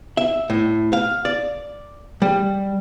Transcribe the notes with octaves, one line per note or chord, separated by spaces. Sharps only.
E5
A2
F5
D5
G3